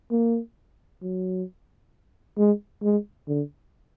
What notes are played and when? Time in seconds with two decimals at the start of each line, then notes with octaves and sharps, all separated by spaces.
0.11 A#3
1.02 F#3
2.37 G#3
2.83 G#3
3.28 D3